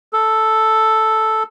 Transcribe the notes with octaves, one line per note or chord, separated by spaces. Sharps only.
A4